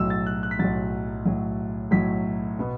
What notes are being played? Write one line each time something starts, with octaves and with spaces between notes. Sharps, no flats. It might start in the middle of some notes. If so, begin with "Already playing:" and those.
Already playing: B1 A2 F#3 E6
A6
F#6
F#6
B6
B1 A2 F#3 A6
B1 A2 F#3
B1 A2 F#3 B6
B2 B3